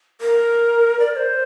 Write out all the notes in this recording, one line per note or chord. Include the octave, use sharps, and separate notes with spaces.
A#4
D5
D5
C5